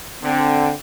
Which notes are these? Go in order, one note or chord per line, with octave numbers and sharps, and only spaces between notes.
D3 C4